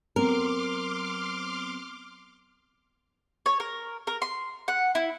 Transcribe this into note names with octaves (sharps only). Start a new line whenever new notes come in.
F#3 B3 C4 A#4 C6 D6 F6
C#5
A#4
A#4
C6
F#5
E4